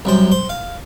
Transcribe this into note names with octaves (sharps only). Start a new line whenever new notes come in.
C2 F#2 C5
C5
F5